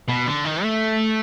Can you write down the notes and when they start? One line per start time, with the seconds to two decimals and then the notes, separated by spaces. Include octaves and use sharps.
0.09 B2
0.27 D3
0.45 D#3
0.63 A3